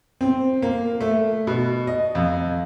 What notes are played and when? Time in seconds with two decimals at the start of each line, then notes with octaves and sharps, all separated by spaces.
0.21 C4
0.62 A#3
1.01 A3
1.47 B2
1.87 D#5
2.15 F2